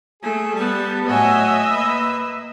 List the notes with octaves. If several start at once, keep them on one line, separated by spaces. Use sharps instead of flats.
A3 G#4
G3 B3 A5
A2 F#3 C#5 D#5 E5 F#5 G#5
A#3 B4